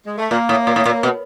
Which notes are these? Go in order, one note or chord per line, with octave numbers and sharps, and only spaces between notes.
G#3
A3
A#2 A#3
A2
A#2
A2
A#2
B2